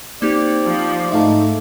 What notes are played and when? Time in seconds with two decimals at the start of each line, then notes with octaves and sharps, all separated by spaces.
0.22 A#3 C4 D#4 G4 D5
0.64 F3
1.11 G#2 A3 D#4 E5 F5 A5